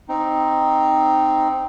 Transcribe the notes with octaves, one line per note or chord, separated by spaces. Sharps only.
C4 D#4